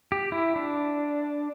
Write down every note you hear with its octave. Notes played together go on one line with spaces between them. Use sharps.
G4
E4
D4